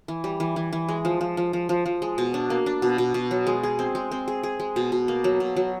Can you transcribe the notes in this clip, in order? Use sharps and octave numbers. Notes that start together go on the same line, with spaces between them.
E3
G3
E3
E3
E3
G#3
F3
F3
F3
F3
F3
F3
G#3
B2
D4
A#3
D4
B2
B2
B2
F#3
G#3
G#4
C4
G#3
C4
G#4
G#4
G#3
B2
B2
A#3
F#3
B2
F#3